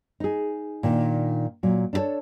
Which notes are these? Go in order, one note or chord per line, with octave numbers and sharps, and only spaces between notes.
D#4 G#4
A#2 D#3 D4
A#2 F#3
D4 E4 F#4 A4 C#5